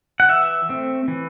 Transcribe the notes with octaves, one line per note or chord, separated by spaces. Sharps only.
F#5
E3 E5
A3 C4
E3